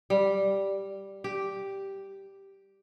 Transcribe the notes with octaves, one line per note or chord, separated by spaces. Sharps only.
G3
G4